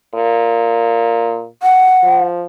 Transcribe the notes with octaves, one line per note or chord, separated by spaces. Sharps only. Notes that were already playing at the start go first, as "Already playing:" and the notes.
A#2
F#5
F3